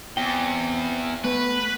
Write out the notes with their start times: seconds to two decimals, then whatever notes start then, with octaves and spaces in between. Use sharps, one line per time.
0.17 E2 C4 G5
1.24 A3 B3 B4